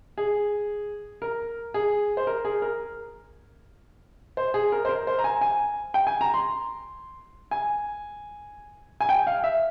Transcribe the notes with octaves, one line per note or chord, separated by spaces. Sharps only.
G#4
A#4
G#4
C5
A#4
G#4
A#4
C5
G#4
A#4
C5
A#4
C5
A#5
G#5
G#5
G5
G#5
A#5
C6
G#5
G#5
G5
F5
E5